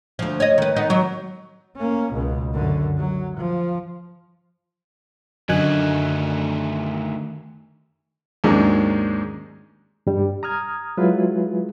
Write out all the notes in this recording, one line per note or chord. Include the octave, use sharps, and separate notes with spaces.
D2 F3
C#5 D#5
D#3 B4
D#3 B3 D#4
F#3
A#3 C#4
C#2 B2
F#2 D3
F#3
F3
F#2 D3 D#3 A3 F#4 D#5 G#5 F#6
D#2 G#2 F#3 G#3 C#4 D4
G2 G3
A#5 D#6 F6 G#6
F#3 G#3 E4 F4 G#4 B4